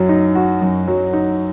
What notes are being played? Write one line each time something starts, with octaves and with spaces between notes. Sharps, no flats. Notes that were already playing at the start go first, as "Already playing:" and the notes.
Already playing: F#2 F#3
D#4
F#4
F#2
F#3
D#4